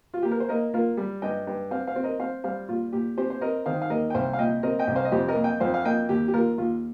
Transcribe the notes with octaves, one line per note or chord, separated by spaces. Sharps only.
F4
A#3 G4
A#4
C5
A#3 A#4 D#5
A#3 F4 A#4
G3
G2 D#5 G5
G2
C4 C5 F5
C5 F5
C4
A#4 D#5
C4 C5 F5
G3 C5 F5
A#2 F4
A#2 G4
C4 G4 C5
C5
C4 A#4 D#5
D#3 C5 F5
F5
D#2 A#4 D#5
G5
C2 C5 F5
F5
A#2 D#5 G5
C4 A#4 D#5
D#5 G5
C2
C5 F5
D#5
F2 G4 C5
A#4 D#5
A#3
D#5 G5
F2 C5 F5
F5
A#3 D#5 G5
D#2 G4
G4
D#2 F4 A#4
D#2 F4